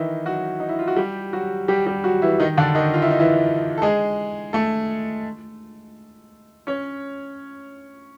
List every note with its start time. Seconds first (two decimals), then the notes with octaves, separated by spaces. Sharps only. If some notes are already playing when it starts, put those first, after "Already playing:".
Already playing: D#3 E3 D#4 E4
0.26 F#3 F#4
0.60 D#4
0.69 E4
0.79 F4
0.88 F#4
0.97 G3 G4
1.33 F#3 F#4
1.68 G3 G4
1.86 G3 G4
2.04 F#3 F#4
2.22 E3 E4
2.40 D#3 D#4
2.57 D3 D4
2.75 D#3 D#4
2.94 F4
3.02 E4
3.11 D#4
3.19 E3 E4
3.78 A4
3.82 G#3 G#4
4.53 A3 A4
6.67 C#4 C#5